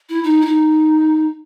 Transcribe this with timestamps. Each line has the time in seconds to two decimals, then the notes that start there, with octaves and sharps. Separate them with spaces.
0.09 E4
0.24 D#4
0.41 E4
0.46 D#4